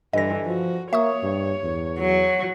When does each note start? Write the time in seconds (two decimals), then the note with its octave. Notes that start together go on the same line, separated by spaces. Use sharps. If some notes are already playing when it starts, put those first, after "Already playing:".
0.13 G2 D3 E3 D#5 A#6
0.46 F3 F#4
0.93 A#3 C#5 E5 C#6 D#6
1.23 G2
1.64 E2
1.99 F#3